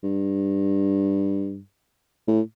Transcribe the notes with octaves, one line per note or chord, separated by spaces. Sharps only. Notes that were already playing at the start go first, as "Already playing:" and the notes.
G2
A2